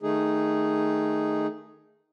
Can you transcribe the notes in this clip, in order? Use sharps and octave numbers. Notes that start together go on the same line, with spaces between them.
D#3 A3 D#4 G#4